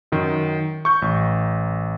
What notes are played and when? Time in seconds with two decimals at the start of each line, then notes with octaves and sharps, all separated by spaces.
0.12 F#2 D#3
0.85 C#6 G6
1.02 A1